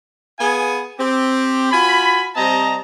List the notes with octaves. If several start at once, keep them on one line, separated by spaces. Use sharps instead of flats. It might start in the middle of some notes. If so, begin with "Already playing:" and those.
B3 G#4 F5 G#5
C4 G4
F4 F#4 G#5 B5
C3 G3 C4 D#5 A5 A#5